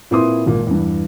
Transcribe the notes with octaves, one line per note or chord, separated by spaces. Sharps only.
A#2 C4 E4 B4 C6 D#6
G#1 A#2
E2 G2